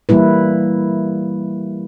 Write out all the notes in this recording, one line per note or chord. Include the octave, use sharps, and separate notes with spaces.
E3 G3 A#3 E4 B4